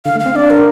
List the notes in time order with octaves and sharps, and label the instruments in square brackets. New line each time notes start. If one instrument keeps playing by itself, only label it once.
[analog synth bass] D3 [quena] F5
[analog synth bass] A3
[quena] F5
[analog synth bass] C4
[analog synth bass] D4 [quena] D5
[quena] A#4